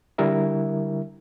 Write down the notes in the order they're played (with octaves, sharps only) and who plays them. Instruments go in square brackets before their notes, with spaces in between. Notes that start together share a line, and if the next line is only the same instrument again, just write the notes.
[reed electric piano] D3 G3 E4 A#4 E5